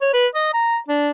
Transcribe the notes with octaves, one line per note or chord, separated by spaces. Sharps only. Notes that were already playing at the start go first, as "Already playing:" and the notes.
C#5
B4
D#5
A#5
D4